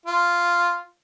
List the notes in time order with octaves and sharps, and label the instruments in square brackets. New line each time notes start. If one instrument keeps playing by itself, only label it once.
[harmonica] F4